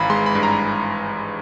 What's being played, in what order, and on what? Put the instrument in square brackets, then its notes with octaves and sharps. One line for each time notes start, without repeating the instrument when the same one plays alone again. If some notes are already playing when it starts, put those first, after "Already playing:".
Already playing: [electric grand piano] G#1 E3 F5 A#5 B5
G#3 C6
B5
G2
A#5